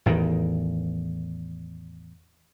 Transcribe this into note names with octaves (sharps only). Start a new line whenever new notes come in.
A1 E2 D#3